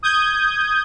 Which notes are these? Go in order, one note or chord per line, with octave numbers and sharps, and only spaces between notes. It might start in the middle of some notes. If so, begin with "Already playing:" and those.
D#6 G6 G#6